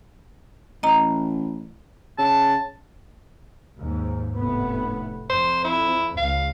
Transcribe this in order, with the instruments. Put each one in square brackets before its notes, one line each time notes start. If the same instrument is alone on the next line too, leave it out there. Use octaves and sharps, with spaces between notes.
[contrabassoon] A1 [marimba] D#5 A#5
[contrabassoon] C#3 [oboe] A5
[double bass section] D#2 G#2
F1 A2 B3
[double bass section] F2 [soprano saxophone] C5
[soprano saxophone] E4
[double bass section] C#2 [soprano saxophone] F5